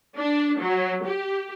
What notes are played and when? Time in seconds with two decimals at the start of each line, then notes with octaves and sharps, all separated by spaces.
0.17 D4
0.60 F#3
1.05 G4